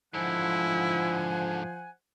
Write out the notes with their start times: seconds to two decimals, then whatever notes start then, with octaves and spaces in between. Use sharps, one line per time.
0.14 G#2 D3 F3 E4 C5 F#5 G#5